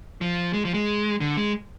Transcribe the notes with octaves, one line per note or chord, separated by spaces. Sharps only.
F3
G#3
F3
G#3
D3
G#3